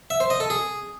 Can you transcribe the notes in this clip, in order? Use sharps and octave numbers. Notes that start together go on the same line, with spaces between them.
E5
C5
D#5
A4
G#4